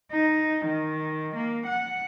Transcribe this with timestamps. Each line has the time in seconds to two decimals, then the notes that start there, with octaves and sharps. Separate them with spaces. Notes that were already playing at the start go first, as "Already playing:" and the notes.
0.12 D#4
0.65 D#3
1.35 A#3
1.66 F#5